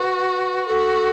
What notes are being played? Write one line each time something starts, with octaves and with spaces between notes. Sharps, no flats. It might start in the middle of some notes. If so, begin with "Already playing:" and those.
Already playing: F#4 B4
F#4 A4